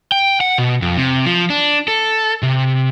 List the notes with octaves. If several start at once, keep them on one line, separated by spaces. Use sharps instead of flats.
G5
F#5
B2
F2
C3
F3
D4
A4
C3